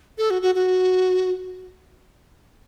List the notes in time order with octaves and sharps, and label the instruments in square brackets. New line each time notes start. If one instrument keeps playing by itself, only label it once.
[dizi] A4
F#4
F#4
F#4